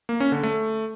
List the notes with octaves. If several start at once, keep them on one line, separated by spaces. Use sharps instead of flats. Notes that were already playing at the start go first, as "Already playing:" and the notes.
A#3
C#4
D3
A3